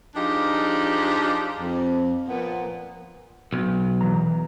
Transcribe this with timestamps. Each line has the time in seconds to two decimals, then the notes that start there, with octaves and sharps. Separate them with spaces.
0.15 F3 D4 D#4 F4 G4 G#4
1.60 F2
2.29 A#2 F3 B3
3.52 B1
4.01 E3 A#5